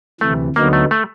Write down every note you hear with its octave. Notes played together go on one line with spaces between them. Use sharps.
D2 C3 E3 A3
D2 D3 F#3 A#3 B3 D#4
A3
A3